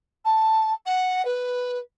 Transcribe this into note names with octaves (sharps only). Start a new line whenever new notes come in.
A5
F#5
B4